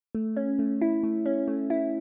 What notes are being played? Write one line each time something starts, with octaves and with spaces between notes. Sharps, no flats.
A3
C#4
A3
E4
A3
C#4
A3
E4